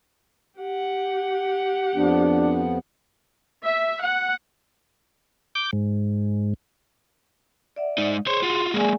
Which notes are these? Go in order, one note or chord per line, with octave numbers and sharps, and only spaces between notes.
G4 F#5
F2 F3 B3 D4
E5
F#5
D6 G6
G#2
D5 E5 F#5
G#3 D#4
G#4 C5 C#5 C6
F4 F#4
G#3 A#3 G#4 D5 G#5